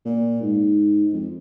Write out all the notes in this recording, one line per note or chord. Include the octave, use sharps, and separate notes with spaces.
A#2
G#2
F2